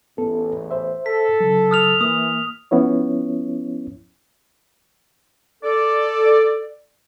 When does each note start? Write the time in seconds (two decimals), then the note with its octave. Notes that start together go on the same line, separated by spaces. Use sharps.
0.18 A1 E2 B3 A4
0.71 C5 E5
1.06 A4 B6
1.40 C#3 F#3
1.71 D#6 F6 F7
2.01 E3 A#3 D#6
2.71 F3 B3 C#4 E4 C#5
5.63 A4 D5